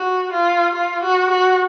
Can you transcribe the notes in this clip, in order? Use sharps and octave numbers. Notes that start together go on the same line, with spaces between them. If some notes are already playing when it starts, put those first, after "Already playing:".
Already playing: F#4
F4
F4
F#4
F#4